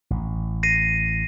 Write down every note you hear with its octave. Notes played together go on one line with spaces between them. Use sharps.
A1
A#6 C7 D#7